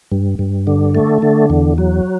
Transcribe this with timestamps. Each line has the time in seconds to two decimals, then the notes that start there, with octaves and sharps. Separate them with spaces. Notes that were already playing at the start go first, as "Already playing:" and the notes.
0.12 G2
0.39 G2
0.67 D3
0.95 A3
1.22 D3
1.50 E2
1.78 F#3